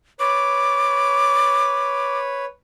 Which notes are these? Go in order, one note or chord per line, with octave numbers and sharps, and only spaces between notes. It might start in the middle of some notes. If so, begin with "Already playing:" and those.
B4 C#5 D6